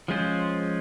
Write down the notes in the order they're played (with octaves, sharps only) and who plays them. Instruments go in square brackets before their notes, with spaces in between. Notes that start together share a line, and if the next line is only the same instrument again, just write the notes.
[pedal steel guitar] F3 G#3 C#4 F4 C5